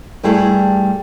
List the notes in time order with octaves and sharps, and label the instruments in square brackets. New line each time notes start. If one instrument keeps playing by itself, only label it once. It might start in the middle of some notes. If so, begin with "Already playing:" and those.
[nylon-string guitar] G2 G3 A3 E4 G#4